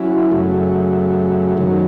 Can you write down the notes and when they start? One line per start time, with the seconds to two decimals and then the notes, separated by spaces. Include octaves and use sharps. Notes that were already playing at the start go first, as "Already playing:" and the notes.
Already playing: F#3 C#4 E4
0.31 F#2 C#3 F#3 A3
1.57 F#2 D#3 F#3